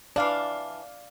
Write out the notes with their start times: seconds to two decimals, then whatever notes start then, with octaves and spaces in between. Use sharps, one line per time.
0.16 E3 D4 D5 F5